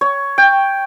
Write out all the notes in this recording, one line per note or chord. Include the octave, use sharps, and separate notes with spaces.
C#5
G5